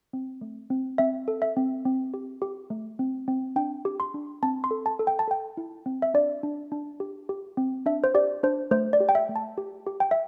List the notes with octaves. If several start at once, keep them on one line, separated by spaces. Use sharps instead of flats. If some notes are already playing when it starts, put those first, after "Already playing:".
C4
A3
C4
C4 E5
A4
E5
C4
C4
G4
G4
A3
C4
C4
D4 G5
G4
C6
D4
C4 A5
C6
A4
A5
A4
G5
A5
A4 G5
E4
C4
E5
D4 D5
D4
D4
G4
G4
C4
D4 E5
C5
G4 D5
D4 C5
A3 C5
D5
G4
G5
E5
A3
A5
G4
G4
G5
E5